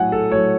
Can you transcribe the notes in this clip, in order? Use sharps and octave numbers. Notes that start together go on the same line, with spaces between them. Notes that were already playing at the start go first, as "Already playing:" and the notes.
Already playing: A2 F#3 F#5 G#5
A4
A2 F#3 C#5